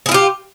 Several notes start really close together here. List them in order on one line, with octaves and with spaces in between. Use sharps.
G#4 E4 F4 G4